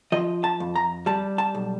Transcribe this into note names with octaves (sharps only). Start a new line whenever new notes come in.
F3 D#5
A5
F2
A#5
G3 A5
A5
B1